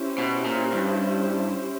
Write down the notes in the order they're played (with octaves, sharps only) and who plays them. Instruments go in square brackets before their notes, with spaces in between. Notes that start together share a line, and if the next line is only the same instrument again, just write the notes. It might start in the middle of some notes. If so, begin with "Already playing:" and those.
Already playing: [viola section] C#4 E4 G4 C5
[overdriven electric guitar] B2
A#2
G2